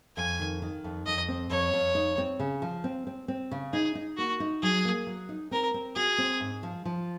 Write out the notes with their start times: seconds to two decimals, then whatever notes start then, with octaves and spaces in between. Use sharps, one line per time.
0.17 F2 G#5
0.40 D#3
0.62 D#3
0.84 F2
1.06 F2 D#5
1.28 C4
1.50 F2 C#5
1.74 F2
1.95 D#4
2.18 C4
2.40 C#3
2.62 F3
2.84 C4
3.07 C4
3.28 C4
3.51 C#3
3.73 D#4 G#4
3.95 D#4
4.17 A#3 F#4
4.40 D#4
4.63 F#3 G#4
4.85 A#3
5.07 F#3
5.29 D#4
5.51 C4 A#4
5.74 C4
5.96 F#4 G#4
6.18 C4
6.40 G#2
6.63 F3
6.85 F3